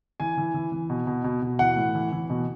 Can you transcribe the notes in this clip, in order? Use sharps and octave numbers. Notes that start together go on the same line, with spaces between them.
E3 G#5
E3
E3
E3
B2
B2
B2
B2
E3 F#5
A2
E3
E3
B2